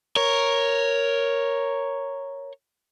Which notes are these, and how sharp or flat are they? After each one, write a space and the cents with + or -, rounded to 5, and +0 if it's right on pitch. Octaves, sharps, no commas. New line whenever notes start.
A#4 +0 C#5 +0